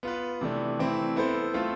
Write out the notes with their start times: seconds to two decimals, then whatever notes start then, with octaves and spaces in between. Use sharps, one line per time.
0.03 B3 F4 B4
0.41 C3 E3 A3 D4
0.79 E3 A3 C4 E4
1.16 B3 E4 A4 C5
1.54 A3 C4 F4 A4